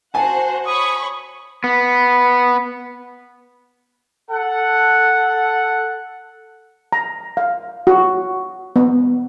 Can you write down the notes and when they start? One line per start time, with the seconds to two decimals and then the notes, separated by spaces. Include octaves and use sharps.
0.14 F#4 C5 F#5 G#5 A5
0.67 C#5 B5 C#6 D#6
1.64 B3
4.31 A4 F#5
6.93 A#5
7.37 F5
7.87 F#4
8.76 B3